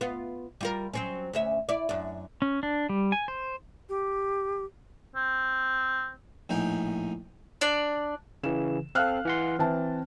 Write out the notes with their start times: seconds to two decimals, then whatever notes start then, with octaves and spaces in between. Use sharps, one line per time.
0.01 B3 F4
0.61 G3 F4 A#4
0.94 F#3 C4 C#4
1.33 D2 C#4 E5
1.69 E4 D5
1.89 F#2 D4
2.42 C#4
2.63 D4
2.89 G3
3.12 G#5
3.28 C5
3.89 G4
5.16 C4
6.49 A#1 A2 D#4 G5 G#5
7.61 D4 D5
8.43 C#3 E3 E7
8.95 C4 A4 F5 F6 F#6
9.25 E3 F#5 C6
9.59 E3 C4 A5